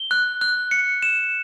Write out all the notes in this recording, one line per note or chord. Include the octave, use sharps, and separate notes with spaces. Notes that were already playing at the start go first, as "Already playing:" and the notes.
Already playing: G7
F#6
F#6
C#7
E7